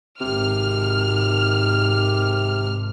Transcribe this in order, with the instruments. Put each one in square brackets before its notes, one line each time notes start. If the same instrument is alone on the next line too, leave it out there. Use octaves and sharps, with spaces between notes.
[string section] G#1 F6 [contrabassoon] C3